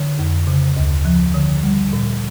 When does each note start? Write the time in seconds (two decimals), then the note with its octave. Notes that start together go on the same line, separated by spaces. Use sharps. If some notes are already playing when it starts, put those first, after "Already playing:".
Already playing: D3
0.19 F2
0.47 C#3
0.77 D2
1.05 F3
1.34 D3
1.63 G3
1.93 A#2